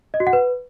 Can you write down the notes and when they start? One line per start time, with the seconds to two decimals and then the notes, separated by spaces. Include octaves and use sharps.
0.14 D#5
0.20 F#4
0.27 F#5
0.33 B4